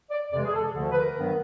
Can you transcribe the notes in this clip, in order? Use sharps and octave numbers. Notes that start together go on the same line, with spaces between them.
D5
F2 C3 E3 G#3 D5
G#4
A4
D2 D3 F3 A3 A4
B4
A#4
G2 D#3 F#3 B3